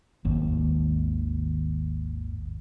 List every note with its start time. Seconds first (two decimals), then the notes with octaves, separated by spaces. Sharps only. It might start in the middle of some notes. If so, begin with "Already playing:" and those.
0.25 G#1 D#2